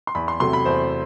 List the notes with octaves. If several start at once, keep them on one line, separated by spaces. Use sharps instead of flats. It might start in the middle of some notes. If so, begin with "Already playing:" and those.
C6
E2 B5
C6
C3 F#3 A3 C6
B5
E2 C5